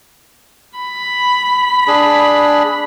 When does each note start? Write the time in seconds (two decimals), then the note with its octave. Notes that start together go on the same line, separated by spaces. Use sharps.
0.79 B5
1.88 D4 G#4